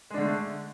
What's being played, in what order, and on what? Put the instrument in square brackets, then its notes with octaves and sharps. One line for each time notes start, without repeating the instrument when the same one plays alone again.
[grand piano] G#3
D4
D3
A3